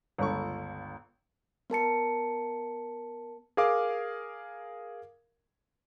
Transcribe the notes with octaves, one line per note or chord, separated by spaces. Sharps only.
G1 C#2 A4 C#6
B3 A#4 A5 C#7
G#4 A#4 F5 D6